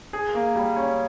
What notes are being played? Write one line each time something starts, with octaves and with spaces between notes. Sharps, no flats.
G#4
A#3
G3
C#4